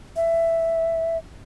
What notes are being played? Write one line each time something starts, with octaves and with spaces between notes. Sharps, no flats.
E5